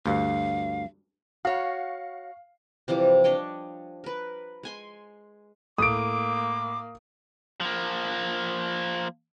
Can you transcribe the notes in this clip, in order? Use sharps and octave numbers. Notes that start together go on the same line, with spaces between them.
D2 G2 F5
F#4 C#5 F5
C3 E3 F3 G3
D4 C#5 D#5 G5
A#4 B4
G#3 G#5 C6
A2 A#3 D6 D#6 D7
F3 A#3